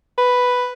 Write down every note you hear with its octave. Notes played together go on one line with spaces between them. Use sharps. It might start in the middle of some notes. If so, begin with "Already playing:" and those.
B4